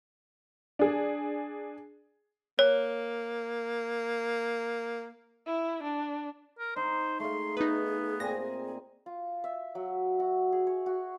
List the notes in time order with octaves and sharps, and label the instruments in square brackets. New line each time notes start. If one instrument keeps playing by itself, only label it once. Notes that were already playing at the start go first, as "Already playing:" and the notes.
[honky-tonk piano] D4 G#4
[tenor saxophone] A#3 [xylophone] C#5
[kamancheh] E4
D4
[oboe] A#4
[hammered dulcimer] D#4 [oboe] C5
[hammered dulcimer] A3 F5 [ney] G#4 [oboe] C6
[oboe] B3 [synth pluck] D#4 B4
[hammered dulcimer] A#2 C4 G#5 [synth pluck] A#6
[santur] F4
E5
F#3
F#4
G#4
C#5
F#4